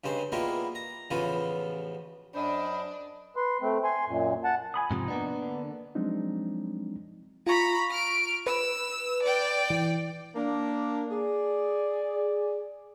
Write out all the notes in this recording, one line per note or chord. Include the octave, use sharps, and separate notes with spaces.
G2 C#3 G#3 C5
G3 G#3 A#3 B3 E4 F4
A#5
A1 C#3 F3 B3 F4
F#2 D4 C5 D#5 B5
B4 C6
A3 C4
G#5 C6
F#2 A#2
F#5 A5
G#5 B5 D#6
G#2 C3 F3 D#4
A#3 B3 D4
D3
F3 F#3 G#3 C4 D4 D#4
F4 A#5 B5 C#6
F6 D7
B4 E6
D5 G5
E3
A#3 D4
G#4 D5